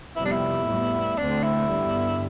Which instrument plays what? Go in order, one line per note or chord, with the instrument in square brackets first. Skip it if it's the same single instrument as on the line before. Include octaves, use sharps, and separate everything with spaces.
[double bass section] F2 C3 G3 B3 [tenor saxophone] E4
[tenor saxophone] D4
E4
[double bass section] A2 G3 B3
[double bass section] D2 D3 A3 C4 [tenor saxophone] D4
[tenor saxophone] E4
[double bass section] G2 D3 G3 B3